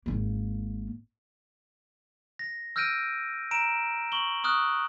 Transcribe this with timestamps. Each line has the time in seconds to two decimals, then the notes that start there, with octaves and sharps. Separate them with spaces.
0.06 G#1 A#3
2.39 A#6
2.76 E6 F6 G6 A#6 D7 D#7
3.51 A#5 D7 E7
4.12 C#6 F#7 G7
4.44 C#6 D#6 F6 F#6